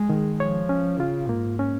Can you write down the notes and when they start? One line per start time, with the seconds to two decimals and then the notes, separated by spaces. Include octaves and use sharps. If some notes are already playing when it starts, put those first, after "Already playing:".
Already playing: G#3 G#4
0.09 D#3
0.40 F3 C#5
0.69 C#4
0.99 C#3 F4
1.29 G#2 A#3
1.59 C#4